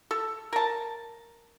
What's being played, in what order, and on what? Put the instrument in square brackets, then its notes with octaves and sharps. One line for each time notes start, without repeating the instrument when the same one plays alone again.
[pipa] A4
A#4 A5